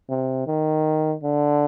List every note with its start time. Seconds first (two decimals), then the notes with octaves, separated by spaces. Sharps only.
0.10 C3
0.47 D#3
1.23 D3